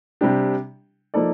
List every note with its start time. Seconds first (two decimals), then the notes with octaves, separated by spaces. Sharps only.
0.21 C3 G3 D4 G4
1.14 F3 A#3 D#4 A4 D5